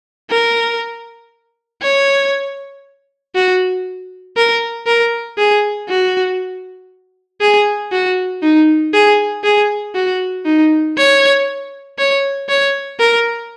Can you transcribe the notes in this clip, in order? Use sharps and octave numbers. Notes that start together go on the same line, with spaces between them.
A#4
C#5
F#4
A#4
A#4
G#4
F#4
G#4
F#4
D#4
G#4
G#4
F#4
D#4
C#5
C#5
C#5
A#4